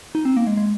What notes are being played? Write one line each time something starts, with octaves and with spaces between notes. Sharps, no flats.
D#4
C4
A#3
G#3
G#3